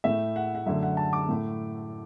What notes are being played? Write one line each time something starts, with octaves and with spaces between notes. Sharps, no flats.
A2 A3 E5
F#5
F#5
F#2 D3 A3 E5
F#5
A5
D6
A2 A3